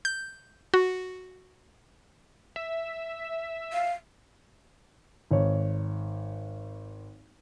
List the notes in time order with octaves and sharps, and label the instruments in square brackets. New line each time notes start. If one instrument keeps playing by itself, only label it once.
[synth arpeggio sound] G6
F#4
[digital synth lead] E5
[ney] F5
[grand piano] G#1 C#5